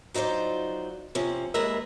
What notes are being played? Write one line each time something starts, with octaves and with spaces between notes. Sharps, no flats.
F#3 D#4 F4 C5 D5
C3 F3 C#4
D#2 G#3 G#4 A#4 B4 E5